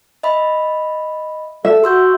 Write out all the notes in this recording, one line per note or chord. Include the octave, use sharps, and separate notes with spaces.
D#5 E5 B5
A4 E5
F#4 C6 E6 G6